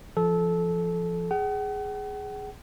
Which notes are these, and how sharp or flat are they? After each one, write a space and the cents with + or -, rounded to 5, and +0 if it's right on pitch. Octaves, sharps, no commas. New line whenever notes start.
F3 -25 A4 -20
G#4 +0 F#5 +40